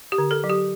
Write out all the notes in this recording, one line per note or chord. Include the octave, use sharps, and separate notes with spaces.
G4
D3
A4
F#3
G4